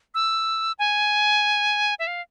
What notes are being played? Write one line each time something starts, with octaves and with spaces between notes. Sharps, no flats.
E6
G#5
E5
F5